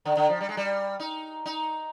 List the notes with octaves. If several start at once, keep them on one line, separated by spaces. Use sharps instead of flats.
D3
D3
F3
G3
G#3
G3
D#4
D#4